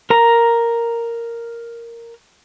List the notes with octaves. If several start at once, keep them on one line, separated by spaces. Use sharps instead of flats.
A#4 A#5